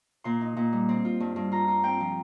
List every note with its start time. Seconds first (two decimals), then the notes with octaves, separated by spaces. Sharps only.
0.24 A#2 C6
0.41 D#4
0.57 A#2
0.73 G3
0.89 C4
1.05 F4
1.20 G2
1.36 G2
1.52 F4 A#5
1.68 F4
1.83 C4 G5
2.00 F3